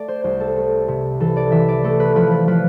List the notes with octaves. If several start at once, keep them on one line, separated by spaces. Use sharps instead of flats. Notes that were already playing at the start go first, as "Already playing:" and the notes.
Already playing: A3 D5
C5
C2 C5
A4
A3
C3
E3 A4
D5
E3 E5
D5
A3 A4
B4
F3 B4
B4
F3 B4